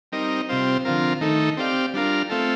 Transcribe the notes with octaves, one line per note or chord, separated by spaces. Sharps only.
G3 C4 D#4 A#4 D#5
C3 G3 C4 F4 C5
D3 F3 C4 F4 A#4
D#3 A3 D#4 A4
C4 G4 D5 F5
G3 D4 F4 A#4
A3 C4 F4 A4